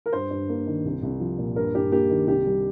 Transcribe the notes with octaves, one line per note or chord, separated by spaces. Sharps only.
A#4
G2 C5
G2
A#3
D#3
C2
C2
F3
A#2
G2 A#4
G2 G4
A#3 G4
D#3
C2 G4
G3